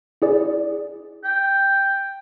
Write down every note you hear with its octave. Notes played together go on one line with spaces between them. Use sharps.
E4 G#4 D5
G5